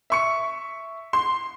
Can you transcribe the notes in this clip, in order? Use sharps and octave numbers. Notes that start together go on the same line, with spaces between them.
E5 C#6 C#7
C6